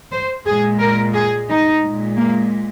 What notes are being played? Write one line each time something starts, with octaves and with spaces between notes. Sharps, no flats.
C5
A#2 G#3 G#4
A#4
G#4
D#4
A#2 G#3
A#3